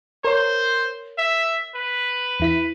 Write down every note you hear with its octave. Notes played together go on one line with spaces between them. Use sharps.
A#4 C5 C#5
E5
B4
E2 E4 B6